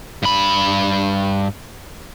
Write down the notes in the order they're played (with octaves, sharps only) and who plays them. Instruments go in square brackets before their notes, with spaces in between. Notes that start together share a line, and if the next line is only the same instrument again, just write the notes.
[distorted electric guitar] G2 B5